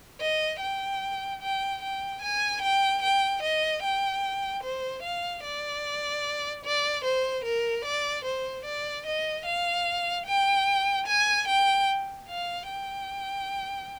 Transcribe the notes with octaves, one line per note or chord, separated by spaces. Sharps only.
D#5
G5
G5
G5
G#5
G5
G5
D#5
G5
C5
F5
D5
D5
C5
A#4
D5
C5
D5
D#5
F5
G5
G#5
G5
F5
G5